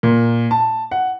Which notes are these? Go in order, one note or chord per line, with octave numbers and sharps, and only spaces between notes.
A#2
A5
F#5